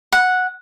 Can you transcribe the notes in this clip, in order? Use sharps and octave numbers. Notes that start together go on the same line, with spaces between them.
F#5